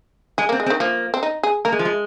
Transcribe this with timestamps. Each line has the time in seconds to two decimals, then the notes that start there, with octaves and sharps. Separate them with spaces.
0.38 G#3 G#4
0.49 A#3
0.52 C4
0.60 G#3
0.66 C4
0.70 D#3
0.80 F3 A#3
1.14 C4
1.23 D#4
1.43 G#4
1.65 A#3 A#4
1.72 G#3
1.79 F3
1.85 G#3